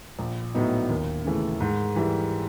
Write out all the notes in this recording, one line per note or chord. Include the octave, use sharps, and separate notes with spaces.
A#1
A2 F#3 B3 D#4
D#2
C#3 E3 A3
G#2
E3 G3